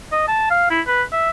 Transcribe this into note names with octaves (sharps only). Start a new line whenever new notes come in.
D#5
A5
F5
E4
B4
E5